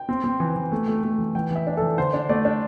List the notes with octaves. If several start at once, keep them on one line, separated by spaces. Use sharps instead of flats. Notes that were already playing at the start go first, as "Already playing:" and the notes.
Already playing: G5
C4
C4
E3
E3
A3
A3
A3
E3
E3 G5
E3 E5
D4
E3 A4
D3 C5
D4
A3 D5
D4